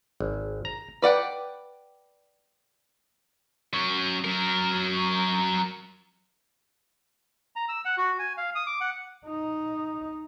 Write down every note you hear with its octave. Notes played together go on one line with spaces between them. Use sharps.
G#1
A#5
B4 D5 F#5 G5
F#3 C#4
F#3 A#4
A#5
E6
F#5
F#4
G#5
F5
D#6
D6
F#5
D#4